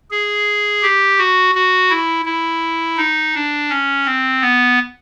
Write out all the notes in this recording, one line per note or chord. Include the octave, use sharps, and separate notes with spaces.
G#4
G4
F#4
F#4
E4
E4
D#4
D4
C#4
C4
B3